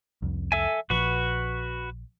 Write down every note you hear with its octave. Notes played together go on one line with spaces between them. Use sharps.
C2 F2
A4 E5 G#5
A#1 F3 F#4 B4 C#6